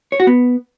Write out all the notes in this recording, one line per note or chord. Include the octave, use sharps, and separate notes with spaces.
C#5
F#4
B3